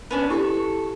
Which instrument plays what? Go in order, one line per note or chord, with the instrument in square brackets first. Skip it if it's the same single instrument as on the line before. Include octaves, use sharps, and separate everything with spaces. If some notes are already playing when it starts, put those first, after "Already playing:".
[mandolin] B3 C#4 D4
[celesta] E4 G4 [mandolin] A4 C#6